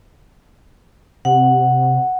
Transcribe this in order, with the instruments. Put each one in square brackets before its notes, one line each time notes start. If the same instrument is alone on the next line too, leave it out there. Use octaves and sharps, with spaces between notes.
[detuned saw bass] C3 [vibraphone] F#5